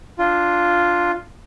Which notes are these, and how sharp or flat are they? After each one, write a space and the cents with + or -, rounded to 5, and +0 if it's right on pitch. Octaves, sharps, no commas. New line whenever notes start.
D4 +0 F4 +0